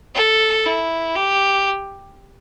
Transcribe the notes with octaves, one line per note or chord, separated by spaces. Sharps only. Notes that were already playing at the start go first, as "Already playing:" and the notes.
A4
E4
G4